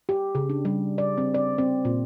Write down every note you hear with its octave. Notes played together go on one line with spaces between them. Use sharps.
G4
C#3
D4
G3
D5
C4
D5
C4
A#2